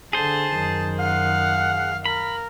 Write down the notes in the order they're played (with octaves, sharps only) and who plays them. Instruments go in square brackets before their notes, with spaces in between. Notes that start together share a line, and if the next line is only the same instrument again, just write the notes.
[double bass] D3 [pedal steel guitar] G#4 C5 [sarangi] A5
[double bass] F#2 D#3
[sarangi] F5 [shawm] F#5
[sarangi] A#4 [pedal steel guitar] B5